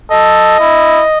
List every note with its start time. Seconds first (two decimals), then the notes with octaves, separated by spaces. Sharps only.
0.11 A4 D#5
0.60 E4